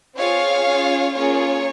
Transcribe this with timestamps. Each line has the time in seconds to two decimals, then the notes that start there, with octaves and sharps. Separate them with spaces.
0.17 C4 F4 G#4 C#5 F5
0.66 C#4 F4 G#4
1.15 A#3 C#4 F4 G#4 C#5